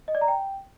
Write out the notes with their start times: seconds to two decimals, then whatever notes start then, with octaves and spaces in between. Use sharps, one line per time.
0.08 D#5
0.15 D5
0.21 A#5
0.28 G5